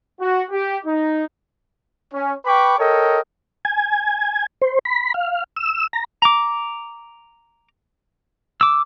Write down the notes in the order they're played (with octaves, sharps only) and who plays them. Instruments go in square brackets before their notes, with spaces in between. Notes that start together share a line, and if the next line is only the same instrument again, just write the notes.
[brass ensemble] F#4
G4
D#4
[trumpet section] C#4
B4 G5 B5 C#6 D6
A4 A#4 C#5 D#5 G5
[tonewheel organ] G#5
C5
B5
F5
E6
A#5
[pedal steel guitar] A#5 D6
D6 E6